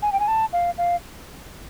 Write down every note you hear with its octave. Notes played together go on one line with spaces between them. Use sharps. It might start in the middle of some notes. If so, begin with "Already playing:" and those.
G#5
G5
G#5
A5
F5
F5